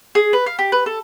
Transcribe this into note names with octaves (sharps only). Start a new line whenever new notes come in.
G#4
B4
F5
G4
B4
A4